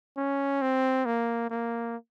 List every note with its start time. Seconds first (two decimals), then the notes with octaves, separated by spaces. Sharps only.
0.17 C#4
0.62 C4
1.06 A#3
1.50 A#3